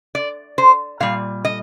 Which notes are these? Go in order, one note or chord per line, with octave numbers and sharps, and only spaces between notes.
D5
C5
A#2 G3 F5
D#5